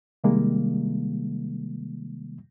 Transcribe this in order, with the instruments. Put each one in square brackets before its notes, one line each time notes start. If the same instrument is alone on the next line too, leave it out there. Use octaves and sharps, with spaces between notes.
[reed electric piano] C3 D#3 G3 G#3 A#3